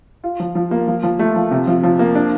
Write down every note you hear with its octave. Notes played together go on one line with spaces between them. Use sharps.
F4
F3
F3
A#3
F3
F3
A3
F3
C3
F3
F3
A#3
D4